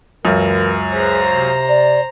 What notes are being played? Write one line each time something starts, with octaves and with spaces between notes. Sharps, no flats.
C#2 F#2 E3 A#4
G#4 B4 C5 A#5
C3
D5